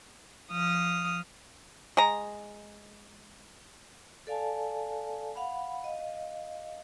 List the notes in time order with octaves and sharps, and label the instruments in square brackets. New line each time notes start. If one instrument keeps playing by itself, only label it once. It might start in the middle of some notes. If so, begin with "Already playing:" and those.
[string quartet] F3 D#6 F6
[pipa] G#3 A#5
[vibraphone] A4 D5 F5 G#5 A5
F5 F#5 B5
D#5 F5